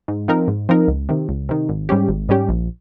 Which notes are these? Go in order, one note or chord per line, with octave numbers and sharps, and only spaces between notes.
G#2
F3 C4 D#4 A#4
G#2
F3 C4 D#4 A#4
C#2
C3 D#3
C#2
C3 D#3
G#1
G#2 G3 C#4 G4
G#1
G#2 G3 C#4 G4
A#1